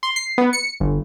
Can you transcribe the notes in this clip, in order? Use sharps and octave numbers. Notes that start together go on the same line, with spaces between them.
C6
C7
B3
C#7
G1